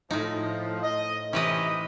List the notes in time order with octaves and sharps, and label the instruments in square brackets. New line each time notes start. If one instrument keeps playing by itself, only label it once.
[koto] A2 D#4 [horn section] F3
[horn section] D#5
[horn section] C3 C#4 D#4 [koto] E3 B4 D#5